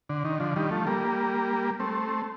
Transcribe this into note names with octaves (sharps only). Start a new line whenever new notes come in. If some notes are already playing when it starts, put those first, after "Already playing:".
D3
D#3
D3 F3
D#3 G3
F3 A3
G3 A#3
A3 C4